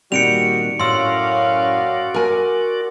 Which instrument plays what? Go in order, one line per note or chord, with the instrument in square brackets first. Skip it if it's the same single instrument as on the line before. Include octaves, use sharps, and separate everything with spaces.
[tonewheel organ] A#2 D#3 [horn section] G3 F#4 [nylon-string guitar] C4 [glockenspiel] C#7 D7 F7
[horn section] F#2 C#4 F5 [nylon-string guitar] A2 [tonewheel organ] F#4 D5 [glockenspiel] C6 E6
[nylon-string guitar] A#4 G#5